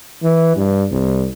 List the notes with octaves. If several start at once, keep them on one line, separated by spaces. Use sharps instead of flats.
E3
G2
C2